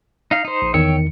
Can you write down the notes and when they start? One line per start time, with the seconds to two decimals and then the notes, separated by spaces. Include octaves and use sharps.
0.31 D#4 F5
0.45 D#4 C5
0.62 A#1
0.74 E2 D#3 C#5 G5 E6 C#7